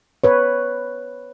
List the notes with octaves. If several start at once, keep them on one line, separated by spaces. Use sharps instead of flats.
B4 C#5